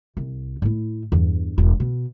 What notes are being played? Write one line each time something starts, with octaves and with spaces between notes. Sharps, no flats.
C2
A2 E4
E2 G2
E1
B2